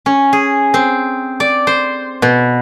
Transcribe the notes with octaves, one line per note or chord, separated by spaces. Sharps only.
C#4
G#4
C4
D5
C5
B2